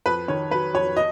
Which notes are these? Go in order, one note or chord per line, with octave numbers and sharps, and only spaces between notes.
F2 B4
D#3 C#5
F#3 B4
F2 C#5
D#5